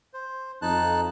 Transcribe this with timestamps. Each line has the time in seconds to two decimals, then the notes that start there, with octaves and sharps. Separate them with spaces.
0.14 C5
0.62 F2 D#4 A5 F#6